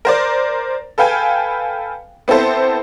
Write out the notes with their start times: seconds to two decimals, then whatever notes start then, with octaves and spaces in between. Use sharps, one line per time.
0.05 A#4 C5 D5
0.98 A4 B4 F5 G5 G#5
2.28 B3 C4 E4 A4 C5